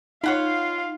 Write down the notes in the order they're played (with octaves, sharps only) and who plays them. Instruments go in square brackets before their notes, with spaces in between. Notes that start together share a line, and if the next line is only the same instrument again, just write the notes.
[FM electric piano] D#4 [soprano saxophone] F4 [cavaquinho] C#5 F#5 B5 [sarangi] F5